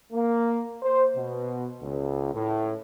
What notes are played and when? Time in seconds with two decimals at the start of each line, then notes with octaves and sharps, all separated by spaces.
0.12 A#3
0.82 C5
1.17 B2
1.82 C#2
2.33 A2